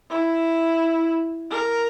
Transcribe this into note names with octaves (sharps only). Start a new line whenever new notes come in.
E4
A#4